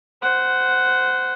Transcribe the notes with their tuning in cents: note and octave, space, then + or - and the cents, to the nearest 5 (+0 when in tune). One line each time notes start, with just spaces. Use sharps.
C5 -15 F#5 +5